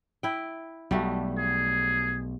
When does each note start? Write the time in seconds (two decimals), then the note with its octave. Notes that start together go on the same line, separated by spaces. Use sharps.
0.23 E4 G5
0.91 B1 G3 A3 F#4
1.38 G#4